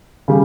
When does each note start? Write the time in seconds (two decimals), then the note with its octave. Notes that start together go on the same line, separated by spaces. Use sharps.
0.28 C#3 G3